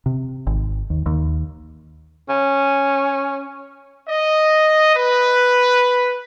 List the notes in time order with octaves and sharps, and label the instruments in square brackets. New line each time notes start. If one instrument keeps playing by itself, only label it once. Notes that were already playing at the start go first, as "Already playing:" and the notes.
[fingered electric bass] C3
G#1
D#2
D#2
[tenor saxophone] C#4
[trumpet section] D#5
B4